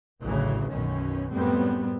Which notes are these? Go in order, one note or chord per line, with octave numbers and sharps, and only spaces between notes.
A1 D2 A2 C#3 E3 F#3
B1 F#2 B2 D#3 C#4
F#2 A2 G3 B3 C4